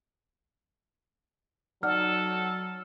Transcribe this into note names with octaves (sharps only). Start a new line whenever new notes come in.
F#3 D#4 A4 D5 F#5 F6